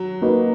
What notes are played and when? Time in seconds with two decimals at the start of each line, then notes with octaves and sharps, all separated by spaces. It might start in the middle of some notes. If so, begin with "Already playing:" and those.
Already playing: F#3
0.22 A#3 D#4 F#4 B4